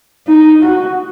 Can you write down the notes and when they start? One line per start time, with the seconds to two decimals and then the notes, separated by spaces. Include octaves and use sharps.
0.28 D#4
0.63 F#4